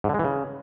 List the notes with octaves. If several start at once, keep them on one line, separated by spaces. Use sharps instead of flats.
G#2
D3
G#3
E3
C#3